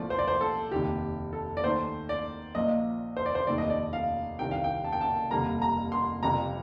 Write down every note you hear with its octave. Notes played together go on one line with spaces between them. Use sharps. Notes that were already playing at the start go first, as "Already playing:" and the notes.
Already playing: C2 A#2 F3 A3 D5
C5
D5
C5
A4
F1 D#2 D#3 G4
A4
D5
D#2 D#3 A3 C5
D5
A#1 A#2 F3 A#3 D#5
C5
D5
C5
F1 D#2 D#3 A3 D5
D#5
D5
F5
C2 C3 D#3 G5
F5
G5
A5
G5
A5
F1 D#2 D3 G3 A#3 A#5
A#5
C6
G1 F2 C3 F3 A#5